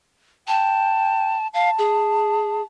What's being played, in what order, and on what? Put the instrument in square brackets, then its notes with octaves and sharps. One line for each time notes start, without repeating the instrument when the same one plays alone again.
[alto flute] G5 [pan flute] A5
[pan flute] F5 [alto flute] A5
[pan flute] G#4